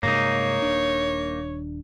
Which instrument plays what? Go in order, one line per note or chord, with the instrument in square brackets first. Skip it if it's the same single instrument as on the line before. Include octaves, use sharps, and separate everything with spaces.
[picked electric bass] G2 C3 G#3 [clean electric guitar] A#3 D#4 [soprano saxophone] C#5
[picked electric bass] D#1 D4